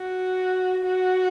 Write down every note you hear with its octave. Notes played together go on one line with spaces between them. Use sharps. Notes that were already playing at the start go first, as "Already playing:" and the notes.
Already playing: F#4
F#4